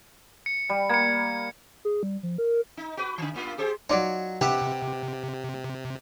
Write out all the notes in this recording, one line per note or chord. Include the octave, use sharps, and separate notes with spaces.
C#7
G3
A#3 G#6 C#7
G#4
G3
F3
A#4
D#4
F#4 B4
C#3 E3
G2 A#3 F4
G4 G#4 C5
F#3 D#4 F4 C#5 D5
C3 G4 B4 E5 F#5